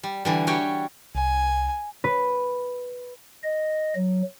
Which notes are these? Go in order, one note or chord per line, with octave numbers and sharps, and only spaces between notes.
G3
D3 E3 G3
G3 F#4 C#5 G5
C2 G#5
B4
D#5
F#3